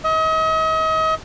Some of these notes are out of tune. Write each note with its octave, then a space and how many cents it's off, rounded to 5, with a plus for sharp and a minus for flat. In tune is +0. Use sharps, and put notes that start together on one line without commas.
D#5 +40